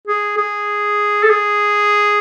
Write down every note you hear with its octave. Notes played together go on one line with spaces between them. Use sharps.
G#4
G#4
A4
G#4